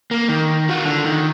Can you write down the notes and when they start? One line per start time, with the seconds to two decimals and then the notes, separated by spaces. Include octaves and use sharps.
0.11 A#3
0.29 D#3
0.69 F4 F#4
0.84 D3
1.04 D#3